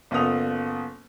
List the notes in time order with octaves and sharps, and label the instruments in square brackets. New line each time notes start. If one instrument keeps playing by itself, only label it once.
[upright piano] F#1 B3 F4 A4 D#6 F7